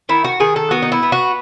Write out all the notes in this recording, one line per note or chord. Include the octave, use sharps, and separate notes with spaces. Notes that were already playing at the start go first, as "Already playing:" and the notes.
D#3 E4
F#4
D#3 G#4
A4
B3 F#4
D#4
E4
B3
F#4